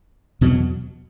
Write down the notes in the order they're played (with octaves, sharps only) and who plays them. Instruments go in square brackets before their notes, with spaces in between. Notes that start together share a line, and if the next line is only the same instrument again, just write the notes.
[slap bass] E2 B2 F#3